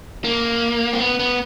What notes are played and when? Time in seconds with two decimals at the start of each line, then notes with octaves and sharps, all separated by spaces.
0.24 A#3
0.93 C4
1.00 B3
1.19 B3